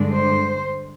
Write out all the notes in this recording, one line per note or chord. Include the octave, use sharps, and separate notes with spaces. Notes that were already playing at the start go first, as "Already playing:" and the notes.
Already playing: G2 D3 G#3 D4
C5